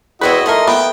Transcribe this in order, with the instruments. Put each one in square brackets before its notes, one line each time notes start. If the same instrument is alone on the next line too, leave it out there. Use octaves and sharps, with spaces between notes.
[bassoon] E2 [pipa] B3 C4 B4 [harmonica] E4 F#4 D#5
[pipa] F3 D#4 A#4 [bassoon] A3 [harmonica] D#5 C6
[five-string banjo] B3 [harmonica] G5